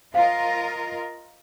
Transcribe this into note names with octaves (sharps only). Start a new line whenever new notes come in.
F4 A#4 C5 D#5 F5